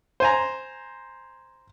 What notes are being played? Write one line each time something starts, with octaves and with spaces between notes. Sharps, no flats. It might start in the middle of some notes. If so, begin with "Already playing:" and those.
C5 G#5 A#5